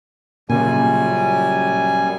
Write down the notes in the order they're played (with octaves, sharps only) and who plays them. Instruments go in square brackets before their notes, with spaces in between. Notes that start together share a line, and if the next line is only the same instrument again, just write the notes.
[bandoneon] F#2 G3 G#5 [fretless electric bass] A#2 C#3